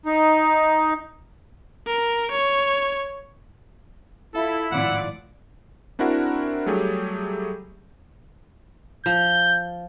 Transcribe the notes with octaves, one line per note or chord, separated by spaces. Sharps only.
D#4
A#4
C#5
E4 F4 A4 E5 F5
G#1 A2 F3 D5 F#5
C4 D4 E4 F#4 A#4 F#5
F#3 G3 A3 G4 G#4
F3 G6